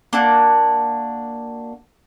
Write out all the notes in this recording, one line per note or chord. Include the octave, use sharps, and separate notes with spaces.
A#3 D4 F#4